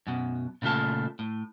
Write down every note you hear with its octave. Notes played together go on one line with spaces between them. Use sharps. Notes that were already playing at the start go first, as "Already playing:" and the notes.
F#2 B2
A#2 C#3 A3 F4 A5
A2